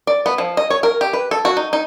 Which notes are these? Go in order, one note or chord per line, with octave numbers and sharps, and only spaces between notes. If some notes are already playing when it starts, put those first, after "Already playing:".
D5
B3
F3
D#5
C#5
A#4
G4
B4
A4
F#4
D#4
D#4